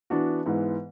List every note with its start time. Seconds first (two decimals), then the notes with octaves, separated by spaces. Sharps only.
0.10 E3 B3 D4 F#4
0.46 G#2 E3 B3